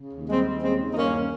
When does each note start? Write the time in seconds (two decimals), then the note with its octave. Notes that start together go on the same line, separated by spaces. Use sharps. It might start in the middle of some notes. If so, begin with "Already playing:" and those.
Already playing: C#3
0.11 D#2
0.27 G3 G#3 C4
0.45 D#2
0.61 C#3 G#3 C4
0.79 D#2
0.91 D#4
0.95 G2 A#3 C#4